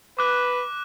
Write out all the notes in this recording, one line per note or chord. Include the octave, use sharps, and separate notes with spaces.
B4 D6 F#6